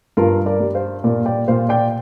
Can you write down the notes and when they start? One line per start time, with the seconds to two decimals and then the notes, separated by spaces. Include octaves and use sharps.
0.17 G2 F4 A#4
0.46 A#4 D5
0.60 G3
0.75 C5 F5
1.04 A#2 A#4 D5
1.26 D5 G5
1.48 A#2 C5 F5
1.69 D5 G5